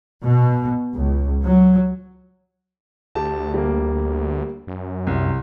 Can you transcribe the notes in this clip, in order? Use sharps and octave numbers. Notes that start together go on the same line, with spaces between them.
B2
C#2
F#3
D2 G4 A5
G3 A#3
F#2
C2